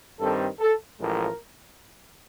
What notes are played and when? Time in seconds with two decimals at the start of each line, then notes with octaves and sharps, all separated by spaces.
0.19 G2 D#3 G3 C4 A4
0.60 A4
0.99 A1 A2 F3 G#3 A#4